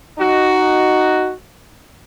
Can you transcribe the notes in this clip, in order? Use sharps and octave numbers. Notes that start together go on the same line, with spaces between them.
D#4 F#4